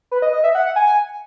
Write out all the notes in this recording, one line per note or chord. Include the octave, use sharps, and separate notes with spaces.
B4
D#5
D#5
E5
F#5
G#5